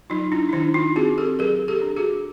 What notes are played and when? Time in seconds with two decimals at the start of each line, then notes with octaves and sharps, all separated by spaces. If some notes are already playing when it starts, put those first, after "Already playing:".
0.10 F#3 D#4 F4
0.32 D4 E4
0.49 D#4
0.53 D#3 D4 E4
0.74 D#4 F4
0.96 C4 F#4 G#4
1.18 G4 A4
1.39 F#3 G#4 A#4
1.68 G4 A4
1.82 D4
1.96 F#4 G#4